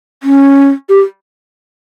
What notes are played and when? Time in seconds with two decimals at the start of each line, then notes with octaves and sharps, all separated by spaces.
0.23 C#4
0.89 G4